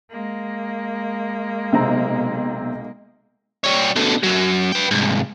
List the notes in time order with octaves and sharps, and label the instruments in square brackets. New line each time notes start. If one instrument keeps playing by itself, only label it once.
[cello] G#3 A#3
[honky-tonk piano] B1 [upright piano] C3 C4 A#5
[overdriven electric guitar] G3 C#5
B2 D3
F#2 F#3
B4 G5
C2 G#2